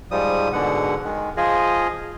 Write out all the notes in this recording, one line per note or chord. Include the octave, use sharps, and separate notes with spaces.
G#2 F3 G3 D#6
G#2 B2 D3 F#5
D#3 G#3
F3 F4 G#4 D#5